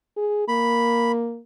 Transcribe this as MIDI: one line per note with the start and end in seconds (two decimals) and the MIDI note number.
0.17 0.45 68
0.48 1.40 58
0.48 1.12 83